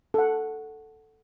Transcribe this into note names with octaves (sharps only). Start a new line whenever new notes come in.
A4 F#5